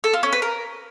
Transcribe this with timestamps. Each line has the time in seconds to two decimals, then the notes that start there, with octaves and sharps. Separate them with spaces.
0.04 A4
0.13 F4
0.23 C#4
0.33 B4
0.42 A#4